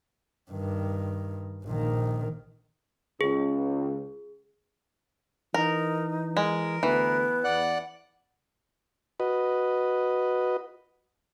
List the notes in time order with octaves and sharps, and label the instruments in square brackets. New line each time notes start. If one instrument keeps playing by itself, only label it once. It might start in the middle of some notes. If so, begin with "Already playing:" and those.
[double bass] G2 D#3
A#1 D#3
[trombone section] C#2 [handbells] G#4
[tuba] E3 [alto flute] D#4 [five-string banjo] A#4
[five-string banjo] G#3 [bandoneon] A#4
[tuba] D2 [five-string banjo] E3 [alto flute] B3
[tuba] E2 [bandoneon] D5 F#5 F#6
[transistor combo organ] F#4 B4 D#5